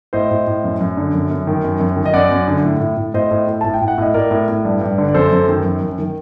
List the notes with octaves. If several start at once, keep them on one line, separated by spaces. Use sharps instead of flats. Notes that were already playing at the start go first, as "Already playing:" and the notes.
A2 C5 D#5
A2
A2
F#2
F#2
D3
F#2
F#2
D#3
F#2
F#2
D#3
D#5
F#2 D5 F#5
F#2
D3
A2
A2
A2
A2 C5 D#5
A2
A2
A2 A5
G5
A2
F#5
A2 D#5
A2 A#4 D5
A2
A2
G2
G2
D3
D5
F#2 A4 C5
F#2
D#3
F#2
F#2
D#3